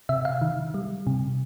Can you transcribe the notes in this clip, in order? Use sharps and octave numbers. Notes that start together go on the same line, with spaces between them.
C3 E5
F5
D#3
G3
C3